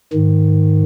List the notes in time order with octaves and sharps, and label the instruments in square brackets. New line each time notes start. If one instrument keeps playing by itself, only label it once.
[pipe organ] G#2 D#3